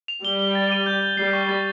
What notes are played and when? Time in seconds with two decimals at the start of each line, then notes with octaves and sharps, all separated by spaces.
0.08 F7
0.24 G3 G7
0.39 G7
0.55 A6
0.72 D#7
0.86 G6
1.03 G6
1.17 G3 C7
1.34 C#6
1.49 A6